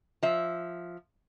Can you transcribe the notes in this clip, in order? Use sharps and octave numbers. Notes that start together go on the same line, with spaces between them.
F3 E5